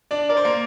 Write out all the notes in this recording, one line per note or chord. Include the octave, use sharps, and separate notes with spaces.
D4 D5
A#4 D5
C5
A#3 A#4